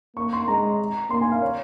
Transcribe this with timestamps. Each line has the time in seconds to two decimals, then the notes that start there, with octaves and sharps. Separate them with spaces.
0.17 A#3 C#6
0.33 C6
0.48 G#3 A#5
1.10 A#3 C6
1.21 G#5
1.32 F5
1.42 C#5